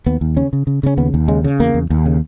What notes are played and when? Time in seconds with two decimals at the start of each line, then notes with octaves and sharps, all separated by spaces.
0.06 D#2 B3
0.21 D#2
0.37 C#3 C#4
0.53 C#3
0.67 C#3
0.83 C#3 C#4
0.97 D#2 B3
1.14 D#2
1.28 C#3 G#3
1.44 C#3
1.60 E2 A#3
1.74 E2
1.90 D#2
2.06 C#3